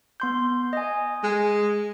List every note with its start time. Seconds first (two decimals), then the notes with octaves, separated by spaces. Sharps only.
0.20 B3 C6 G6
0.73 D#5 G#5
1.24 G#3